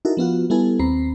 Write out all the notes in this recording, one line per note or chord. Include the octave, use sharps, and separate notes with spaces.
D#4 E4 F#4 A4 A#4
F3 B3 F4 F#4
G3 B3 E4 A4 G#5
D#2 C4 A#5 B5 C7